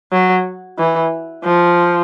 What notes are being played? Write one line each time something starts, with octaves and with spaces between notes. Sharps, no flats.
F#3
E3
F3